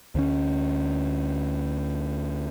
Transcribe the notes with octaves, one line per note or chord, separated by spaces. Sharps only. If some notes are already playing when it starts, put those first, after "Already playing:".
D2 C#4